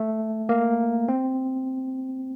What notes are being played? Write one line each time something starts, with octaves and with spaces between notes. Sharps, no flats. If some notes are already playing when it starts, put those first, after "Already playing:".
Already playing: A3
A#3
C4